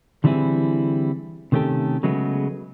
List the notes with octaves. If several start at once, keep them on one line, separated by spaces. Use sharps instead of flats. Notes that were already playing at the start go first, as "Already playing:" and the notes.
D3 E3 G3 C4 E4 G#4
C3 D#3 A3 C#4 G4 A4
C#3 F#3 G#3 A3 B3